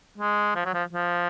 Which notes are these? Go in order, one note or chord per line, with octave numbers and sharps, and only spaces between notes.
G#3
F3
F#3
F3
F3